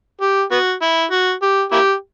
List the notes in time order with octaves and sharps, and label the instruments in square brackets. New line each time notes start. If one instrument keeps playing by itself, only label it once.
[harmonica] G4
B3 F#4
E4
F#4
G4
A#3 E4 G4